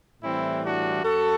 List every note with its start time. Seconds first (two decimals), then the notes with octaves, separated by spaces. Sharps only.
0.22 A2 E3 G3 C4 E4
0.63 D4 F#4
1.03 F#2 F#4 A4